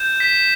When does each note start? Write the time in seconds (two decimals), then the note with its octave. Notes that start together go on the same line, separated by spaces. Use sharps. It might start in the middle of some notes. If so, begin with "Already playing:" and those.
Already playing: G6 E7
0.20 B6